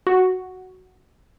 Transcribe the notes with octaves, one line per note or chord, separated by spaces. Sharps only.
F#4